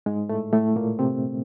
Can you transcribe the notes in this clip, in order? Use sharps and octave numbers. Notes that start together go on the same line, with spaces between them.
G#2 G#3
A2 A3
A2 A3
A#2 A#3
C3 C4